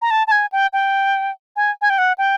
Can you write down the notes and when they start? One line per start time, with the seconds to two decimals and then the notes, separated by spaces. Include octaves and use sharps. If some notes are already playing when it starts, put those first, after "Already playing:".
0.02 A#5
0.11 A5
0.27 A5
0.32 G#5
0.52 G5
0.73 G5
1.56 G#5
1.82 G#5
1.90 G5
1.98 F#5
2.18 G5